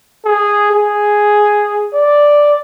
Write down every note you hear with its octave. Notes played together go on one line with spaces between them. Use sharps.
G#4
G#4
D5